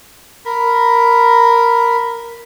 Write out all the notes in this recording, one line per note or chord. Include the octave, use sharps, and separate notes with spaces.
A#4 B5